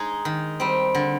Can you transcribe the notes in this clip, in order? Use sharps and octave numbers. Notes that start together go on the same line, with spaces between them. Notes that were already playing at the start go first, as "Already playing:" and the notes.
Already playing: G#3 D#4 G#4
D#3
G3 C4
D3